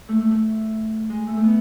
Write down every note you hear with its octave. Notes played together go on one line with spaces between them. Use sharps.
A3
A3
A3
G#3
A3
A3
B3